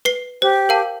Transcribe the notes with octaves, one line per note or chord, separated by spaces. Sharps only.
B4 C7 G7
G4 C5
A#4 F5 A5